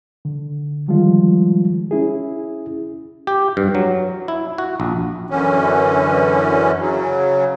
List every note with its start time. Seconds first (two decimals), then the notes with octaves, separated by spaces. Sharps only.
0.25 D3
0.88 D#3 F3 G3 G#3 F4
1.91 C#4 E4 G#4
3.27 G4
3.57 G2
3.75 F#3
4.28 E4
4.58 F#4
4.80 A#1
5.30 F#2 D3 E3 C#4
6.80 C#3 F#3